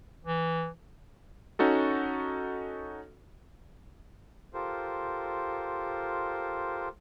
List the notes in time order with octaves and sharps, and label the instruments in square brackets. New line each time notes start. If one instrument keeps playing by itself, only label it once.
[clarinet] E3
[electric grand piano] C#4 D#4 F#4 A4
[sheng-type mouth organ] F4 G4 A4 A#4 C5